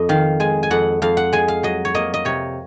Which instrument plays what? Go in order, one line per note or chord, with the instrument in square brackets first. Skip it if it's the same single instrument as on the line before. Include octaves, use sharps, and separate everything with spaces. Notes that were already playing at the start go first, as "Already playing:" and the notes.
Already playing: [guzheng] F2 D#5
D#3 F5
G#3 G#5
G#5
F2 F#5
F2 F5
F#5
G#3 G#5
F5
F#3 D#5
C#5
A#3 D#5
D#5
C3 C#5